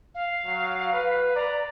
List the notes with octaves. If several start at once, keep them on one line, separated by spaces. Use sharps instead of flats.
F5
F#3
B4
D5 A#5